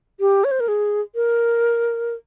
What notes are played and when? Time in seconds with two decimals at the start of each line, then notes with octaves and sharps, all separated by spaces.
0.20 G4
0.44 C#5
0.51 C5
0.60 A#4
0.68 G#4
1.15 A#4